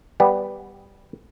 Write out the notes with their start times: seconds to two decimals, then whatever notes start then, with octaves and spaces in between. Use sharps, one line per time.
0.20 G3 B3